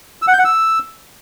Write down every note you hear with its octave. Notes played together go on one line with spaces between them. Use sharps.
E6
F#5
G6
F#5
E6